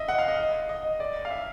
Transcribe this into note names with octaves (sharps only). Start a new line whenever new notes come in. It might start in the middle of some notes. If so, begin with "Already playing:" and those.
Already playing: D#5 E5
F#5
F5
D#5
D#5
D5
F5
E5